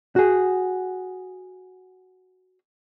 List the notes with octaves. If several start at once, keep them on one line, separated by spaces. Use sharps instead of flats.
F#4 G#4